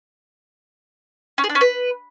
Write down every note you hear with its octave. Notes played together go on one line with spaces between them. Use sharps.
C#4
G#4
D4
C#4
B4